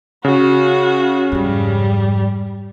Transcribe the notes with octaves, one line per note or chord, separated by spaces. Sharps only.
C#3 F#4
F2 G#2 G3